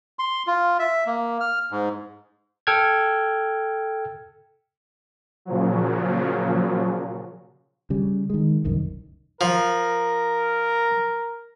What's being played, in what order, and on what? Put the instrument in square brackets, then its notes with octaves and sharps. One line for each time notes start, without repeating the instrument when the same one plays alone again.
[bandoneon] C6
F4
E5
A#3
F6
G#2
[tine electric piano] A4 G5 F6 G#6
[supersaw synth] A#2 C#3 F3 F#3
[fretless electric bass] C#3 G3
D#3 G#3
F1 C2 F#2 D#3
[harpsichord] F3 [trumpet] A#4